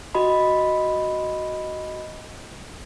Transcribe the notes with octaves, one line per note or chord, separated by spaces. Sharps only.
F#4 D#5 B5